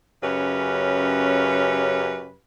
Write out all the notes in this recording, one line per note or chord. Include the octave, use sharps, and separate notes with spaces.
F#2 C#3 C#4 G4 B4